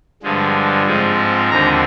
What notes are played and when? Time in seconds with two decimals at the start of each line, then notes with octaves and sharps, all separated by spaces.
0.23 G2 D3 F3 G#3
0.86 G#2 F3 G#3 C4
1.50 D#2 D3 F3 C4 A#5